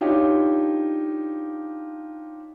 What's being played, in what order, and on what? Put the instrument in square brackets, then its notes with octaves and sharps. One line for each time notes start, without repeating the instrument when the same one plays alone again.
[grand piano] D4 D#4 F4 G4 C#5